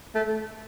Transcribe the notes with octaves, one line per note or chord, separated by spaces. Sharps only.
A3